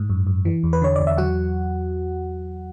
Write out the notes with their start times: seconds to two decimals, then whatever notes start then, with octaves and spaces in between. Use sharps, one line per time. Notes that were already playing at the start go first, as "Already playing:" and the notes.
Already playing: G#2
0.10 F#2
0.27 F#2
0.45 E3
0.63 E2
0.73 B4
0.82 D3 C#5
0.96 E2 D5
1.07 E5
1.18 F#3 F#4 F#5